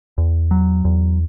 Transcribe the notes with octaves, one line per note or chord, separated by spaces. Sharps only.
E2
F#3
E2